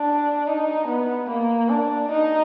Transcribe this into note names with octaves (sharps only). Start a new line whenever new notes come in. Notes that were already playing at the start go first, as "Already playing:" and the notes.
Already playing: D4
D#4
B3
A#3
D4
D#4